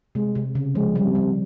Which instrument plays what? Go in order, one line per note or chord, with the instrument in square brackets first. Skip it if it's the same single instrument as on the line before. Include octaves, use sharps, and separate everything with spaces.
[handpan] C3 [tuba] G#3
[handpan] C3
C#3
[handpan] F3 [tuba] G#3
[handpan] G3
[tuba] C3
[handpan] G3